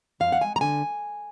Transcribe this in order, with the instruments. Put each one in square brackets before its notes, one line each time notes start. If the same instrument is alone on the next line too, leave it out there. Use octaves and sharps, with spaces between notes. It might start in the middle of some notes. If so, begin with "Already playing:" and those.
[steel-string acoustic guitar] F2 F5
F#5
G#3 G#5
A#5
D3 G#5